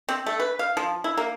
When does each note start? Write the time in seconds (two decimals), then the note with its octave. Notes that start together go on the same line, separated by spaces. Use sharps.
0.09 C4
0.26 A3
0.40 B4
0.59 F5
0.77 F3
1.04 E4
1.17 A#3